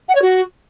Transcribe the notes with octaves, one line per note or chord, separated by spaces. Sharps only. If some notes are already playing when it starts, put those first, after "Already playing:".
F#5
C#5
F#4